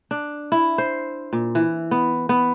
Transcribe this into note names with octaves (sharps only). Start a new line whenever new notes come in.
D4
E4
C5
A#2
E3
B3
B3